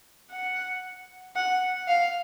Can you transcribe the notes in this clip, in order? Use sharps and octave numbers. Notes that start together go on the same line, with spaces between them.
F#5
F#5
F5